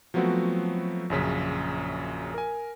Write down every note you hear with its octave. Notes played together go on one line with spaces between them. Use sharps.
F3 F#3 A3 B3 C4 F#4
A#1 F#2 C#3 B6
A#4 G#5